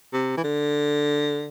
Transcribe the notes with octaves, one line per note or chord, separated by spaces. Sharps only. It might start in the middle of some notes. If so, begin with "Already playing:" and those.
C3
E3
D3